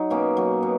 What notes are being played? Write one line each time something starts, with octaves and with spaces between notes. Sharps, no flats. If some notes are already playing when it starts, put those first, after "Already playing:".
Already playing: F#3 D#4
B2 A#3 C#4
F#3
B2